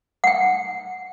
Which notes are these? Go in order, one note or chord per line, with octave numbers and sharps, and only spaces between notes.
F#5 G5